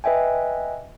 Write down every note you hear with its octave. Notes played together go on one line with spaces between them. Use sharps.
B4 D#5 E5 G5 G#5